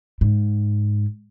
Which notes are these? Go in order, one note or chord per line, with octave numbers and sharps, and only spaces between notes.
G#2